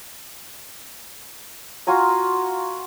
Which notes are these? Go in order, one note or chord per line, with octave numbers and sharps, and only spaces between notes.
F4 F#4 G#5 A#5